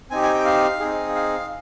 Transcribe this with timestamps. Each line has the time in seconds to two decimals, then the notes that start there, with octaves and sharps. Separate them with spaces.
0.11 C4 D#4 G4 G#5
0.23 G#5
0.34 G5
0.45 F5
0.80 C4 D#4 G#4
1.15 F5